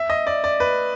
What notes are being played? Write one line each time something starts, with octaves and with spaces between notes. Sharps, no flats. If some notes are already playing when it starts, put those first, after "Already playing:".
Already playing: E5
D#5
D5
D5
B4